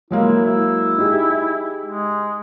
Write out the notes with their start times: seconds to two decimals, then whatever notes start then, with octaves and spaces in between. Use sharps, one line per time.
0.11 F#3 G#3 A#3 E4
0.45 E4
0.98 D#4 G4 G#4
1.86 G#3